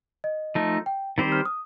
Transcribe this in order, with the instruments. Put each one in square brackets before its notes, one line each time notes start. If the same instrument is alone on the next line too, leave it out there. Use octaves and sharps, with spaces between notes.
[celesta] D#5
[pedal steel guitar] F3 A3 D#4
[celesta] G5
[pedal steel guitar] D#3 G3 C4 G4 C5
[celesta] F6
D#6